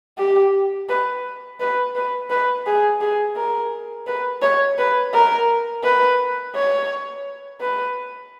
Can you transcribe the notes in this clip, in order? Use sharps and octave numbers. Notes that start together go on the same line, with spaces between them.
G4
B4
B4
B4
B4
G#4
G#4
A#4
B4
C#5
B4
A#4
B4
C#5
B4